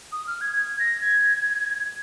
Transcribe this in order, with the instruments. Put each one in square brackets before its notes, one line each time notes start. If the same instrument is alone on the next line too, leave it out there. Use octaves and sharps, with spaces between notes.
[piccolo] D#6
F6
G#6
G#6
A#6
G#6